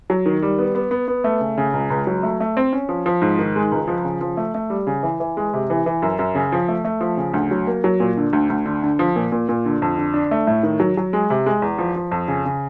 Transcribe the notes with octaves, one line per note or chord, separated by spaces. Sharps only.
F#3
D#3
G3
B3
B3
B3
B3
A3
C#3
C#3
C#2
C#2
F#3
A3
A3
C4
C#4
F3
F3
G#2
D#3
G#3
C#2
F3
C#3
F3
A3
A3
G3
C#3
E3
E3
G#3
C3
E3
E3
F#2
F#2
C#3
F3
A3
A3
F3
C#3
D2
F#3
A#3
F#3
A#2
D3
D2
D2
D3
D3
F3
A#2
A#2
A#2
D3
F2
D3
D4
A3
A2
D#3
F#3
F#3
G#3
C3
G#3
E2
F3
F3
F2
C#3
C#3